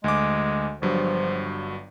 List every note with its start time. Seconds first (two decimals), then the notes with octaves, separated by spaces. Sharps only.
0.04 D2 G#3 D6
0.82 G1 G2 F3 F#3